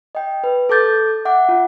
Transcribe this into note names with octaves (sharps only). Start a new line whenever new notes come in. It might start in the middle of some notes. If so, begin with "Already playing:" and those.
D#5 G5
B4
A4 A5 D6 G6 A6
E5 F#5 D6
F4